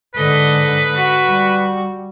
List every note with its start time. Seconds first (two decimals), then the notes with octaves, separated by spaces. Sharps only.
0.15 G#2 D3 A4 B4 D#5
0.94 F#4
1.27 G3